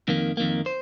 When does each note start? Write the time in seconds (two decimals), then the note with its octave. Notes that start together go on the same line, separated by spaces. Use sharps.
0.08 F2 D#3 A#3
0.37 F2 D#3 A#3
0.66 C5